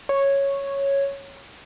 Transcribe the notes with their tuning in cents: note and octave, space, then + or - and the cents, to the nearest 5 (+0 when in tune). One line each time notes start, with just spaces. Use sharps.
C#5 -5